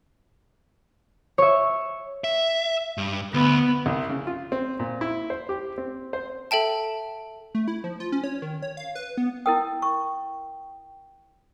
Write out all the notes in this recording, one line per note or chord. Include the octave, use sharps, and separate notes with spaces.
C#5 E5
E5
G2
D2 B3
C2
C#3
F4
C4
A#2
E4
C5
G4
C4
C5
A4 E5 G5 A5
A3
E4
F3
F4
C#4
C#5
D#3
C#5
F5
B4
B3
E4 A#4 G5 D#6
C#6